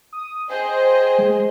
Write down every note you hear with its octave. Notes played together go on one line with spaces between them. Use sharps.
D#6
G#4 C5 D#5 G5
G#3